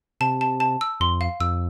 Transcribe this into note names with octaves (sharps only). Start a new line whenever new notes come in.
C3 A5
A5
A5
E6
F2 C6
F5
F2 E6